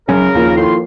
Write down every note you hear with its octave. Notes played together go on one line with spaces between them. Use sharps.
E1 C#3 F#3 C#4 A#4
D#2 F3 A#3
A2 D#3 C6